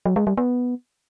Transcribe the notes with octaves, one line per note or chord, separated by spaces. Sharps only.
F#3
G#3
G3
B3